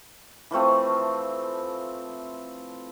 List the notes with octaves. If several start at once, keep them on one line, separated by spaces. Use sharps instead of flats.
E3 F3 A3 C4